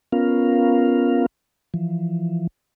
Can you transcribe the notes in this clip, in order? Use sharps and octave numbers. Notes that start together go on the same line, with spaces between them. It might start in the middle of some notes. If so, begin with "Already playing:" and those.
B3 C#4 F4 A#4 F5
E3 F3